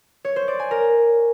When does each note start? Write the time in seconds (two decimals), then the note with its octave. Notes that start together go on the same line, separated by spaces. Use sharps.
0.25 C#5
0.36 C5
0.48 D5
0.59 G#5
0.71 A#4